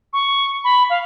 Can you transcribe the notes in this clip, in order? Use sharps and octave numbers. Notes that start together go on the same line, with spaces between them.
C#6
B5
F5